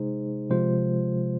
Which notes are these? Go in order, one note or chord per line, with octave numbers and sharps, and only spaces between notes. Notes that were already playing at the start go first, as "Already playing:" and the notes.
Already playing: C3 G#3 D#4 G#4 C5
C3 F3 G#3 F4 C5